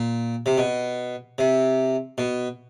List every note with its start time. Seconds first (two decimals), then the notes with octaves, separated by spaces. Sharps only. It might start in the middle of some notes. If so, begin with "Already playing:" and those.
Already playing: A#2
0.46 C3
0.58 B2
1.38 C3
2.18 B2